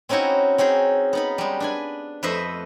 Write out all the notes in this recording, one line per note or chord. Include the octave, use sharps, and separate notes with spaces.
C4 C#4 D#4 E4 F#4 G#5
C4 C#4 D#4 G#4
B3 D#4 B5
G3 G#3
D4 B4 G#5
F2 A3 B4 C5 D#5 E5